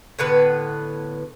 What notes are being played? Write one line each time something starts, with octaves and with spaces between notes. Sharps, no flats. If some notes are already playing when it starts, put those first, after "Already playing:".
A2 D3 B3 B4